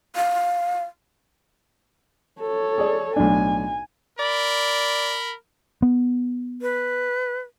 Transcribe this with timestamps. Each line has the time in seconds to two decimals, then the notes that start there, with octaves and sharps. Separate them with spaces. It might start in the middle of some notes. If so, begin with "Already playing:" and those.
0.16 F5
2.40 A4 C#5
2.78 G#4 D5
3.16 B1 A2 D4 G#5
4.19 A#4 D5 B5
5.82 B3
6.62 B4